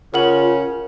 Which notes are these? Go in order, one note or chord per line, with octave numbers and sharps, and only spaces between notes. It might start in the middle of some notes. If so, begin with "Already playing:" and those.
C#3 C#4 F4 A#4 F#5 F#7